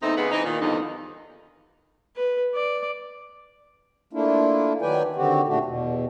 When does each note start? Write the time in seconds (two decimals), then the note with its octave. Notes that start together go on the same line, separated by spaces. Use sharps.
0.03 E2 A3 C4 D#4
0.16 C#3 G#3 B3
0.31 E3 C4 D#4
0.45 A#2 D#3
0.61 E2 G2 D3 F3 D#4
2.16 B4
2.55 D5
4.13 A3 A#3 D4 E4 F4
4.82 D#3 F#3 B4 D5 G5 G#5
5.16 D3 D#3 C4 F#4 G4
5.47 A#2 A3 D4 F#4 G4
5.65 E2 B2